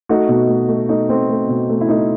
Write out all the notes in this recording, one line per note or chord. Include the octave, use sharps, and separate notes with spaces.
A3 D#4 F#4
B2
A3
A3
A3 D#4
A3 C4
A3
B2
A3
E4
A3 D#4